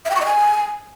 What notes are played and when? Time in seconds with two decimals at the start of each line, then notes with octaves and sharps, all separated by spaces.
0.05 E5
0.10 G5
0.16 C#6
0.21 D#5
0.26 G#5